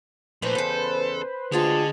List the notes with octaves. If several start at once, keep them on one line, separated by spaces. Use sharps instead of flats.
A#2 F3 A3 E4 B4 C5
E2 C#3 A4
D2 D3 G#3 F4 G#4 G5 A5